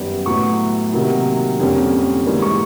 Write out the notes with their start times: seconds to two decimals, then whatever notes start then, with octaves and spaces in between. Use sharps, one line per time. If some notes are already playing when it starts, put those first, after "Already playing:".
Already playing: F#2 D#3 G3 B3
0.26 A2 F#3 B3 C#6
0.93 C3 D#3 F#3 A#3
1.60 F2 D3 G3 A#3 C#4
2.26 G#2 E3 G3 A#3
2.42 C#6